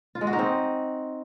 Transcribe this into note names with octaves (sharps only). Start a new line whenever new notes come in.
F4
G#3
F#4
D#4
C4